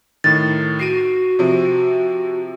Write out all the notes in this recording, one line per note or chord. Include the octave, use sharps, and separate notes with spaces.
A2 D#3 A6
F#4 C7 D7 D#7
C3 F3